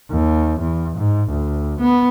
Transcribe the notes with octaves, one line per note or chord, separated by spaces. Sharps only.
D#2
E2
G#2
D2
B3